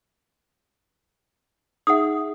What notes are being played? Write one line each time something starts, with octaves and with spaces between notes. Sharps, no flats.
D#4 G#4 E5 F#5 D#6